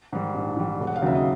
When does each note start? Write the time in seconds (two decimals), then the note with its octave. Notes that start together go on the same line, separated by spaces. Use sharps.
0.12 G#2 D#3 G3
0.35 A#1
0.57 G#2 D#3 G3
0.80 E1
0.87 F#5
0.96 F5
1.02 D#2 C#3 F#3 E5
1.15 D#5